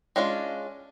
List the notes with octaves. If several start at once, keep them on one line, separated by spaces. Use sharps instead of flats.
G#3 C#4 D4 F4